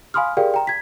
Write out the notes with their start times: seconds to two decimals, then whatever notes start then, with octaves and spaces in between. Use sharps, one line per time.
0.14 F5 G#5 B5 C6 D#6 F6
0.37 G4 G#4 A#4 D5 F5 G5
0.54 G5 A#5
0.67 G#6 B6